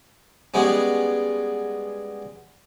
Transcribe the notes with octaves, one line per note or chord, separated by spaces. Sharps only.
G3 G#3 B3 C#4